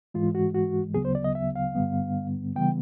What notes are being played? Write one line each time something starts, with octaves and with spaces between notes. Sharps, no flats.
G#2 E3 G#3 F4
F#4
F#4
D2 C#3 F#3 B3 G#4
C5
D5
D#5
E5
F5
G2 D3 G3 B3
C#3 E3 G3 B3 G5